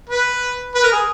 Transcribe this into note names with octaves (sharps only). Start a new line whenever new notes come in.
B4
B4
A#4
G#4